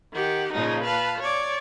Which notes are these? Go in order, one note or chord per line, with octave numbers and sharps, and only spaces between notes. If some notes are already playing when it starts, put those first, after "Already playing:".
D#3 G4 F#5
A#2 C#3 F3 D#4
B4 F5 A5
C#5 D5